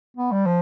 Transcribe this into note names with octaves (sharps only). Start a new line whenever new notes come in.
B3
G3
F3